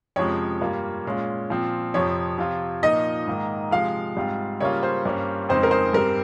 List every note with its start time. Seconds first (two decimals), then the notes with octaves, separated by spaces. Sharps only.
0.16 F2 C3 F3 G#3 C#4 C#5
0.61 G2 G3 A#3 F4
1.05 A#2 G#3 C#4 F4
1.50 A#2 F3 C4
1.94 F2 C3 F3 C#5
2.38 C3 F3 C4 F4
2.83 A#2 F3 A#3 D#4 D#5
3.28 G#2 D#3 A#3
3.71 C3 F3 G#3 F5
4.17 G#2 G3 C4 F4
4.60 C#3 G3 A#3 F4 C#5
4.83 C5
5.05 G2 G3 A#3 C#4
5.49 F2 C#3 G#3 C4 D#4 C5
5.63 A#4
5.71 C5
5.93 G2 G3 C4 A#4